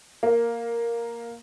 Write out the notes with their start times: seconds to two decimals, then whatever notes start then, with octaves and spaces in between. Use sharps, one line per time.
0.23 A#3